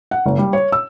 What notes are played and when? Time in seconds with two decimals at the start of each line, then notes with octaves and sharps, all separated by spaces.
0.11 F#5
0.26 F#1
0.38 G3
0.53 C#5
0.72 E6